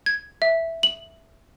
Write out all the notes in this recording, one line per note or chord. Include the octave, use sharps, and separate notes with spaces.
G#6
E5
F#7